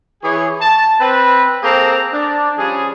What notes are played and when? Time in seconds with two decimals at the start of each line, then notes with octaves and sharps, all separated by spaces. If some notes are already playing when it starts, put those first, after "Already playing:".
0.23 E3 G#4 C#5
0.61 A5
1.00 C4 B4
1.63 A#3 C4 G#4 A4 G5 A#5
2.12 D4
2.58 F3 G3 C#4 G#4